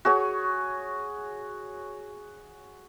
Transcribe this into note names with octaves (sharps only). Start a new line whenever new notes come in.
F#4 G#4 C#5